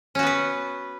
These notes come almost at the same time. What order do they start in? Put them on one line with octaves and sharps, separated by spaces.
C#4 F#4 B3 B4